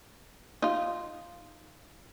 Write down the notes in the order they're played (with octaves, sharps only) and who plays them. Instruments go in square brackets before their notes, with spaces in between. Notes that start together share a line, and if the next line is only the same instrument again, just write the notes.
[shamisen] D#4 F4